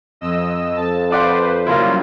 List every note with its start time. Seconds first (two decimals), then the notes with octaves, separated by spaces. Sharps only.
0.21 F2 D#5 E6
0.76 F2 A5
1.11 F4 B4 C5 D5 F#5
1.67 C#3 F#3 G3 A#3 E4 F4